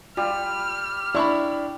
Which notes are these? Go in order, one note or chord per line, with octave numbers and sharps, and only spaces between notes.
G3 F4 F6
D4 E4 B5 C#6